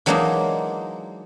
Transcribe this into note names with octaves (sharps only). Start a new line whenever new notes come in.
E3 F#3 G#3 A#3 D4 D#4